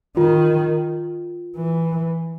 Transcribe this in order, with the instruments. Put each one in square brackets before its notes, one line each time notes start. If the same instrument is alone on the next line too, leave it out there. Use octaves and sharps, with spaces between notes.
[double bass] D#3 [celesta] F4
[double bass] E3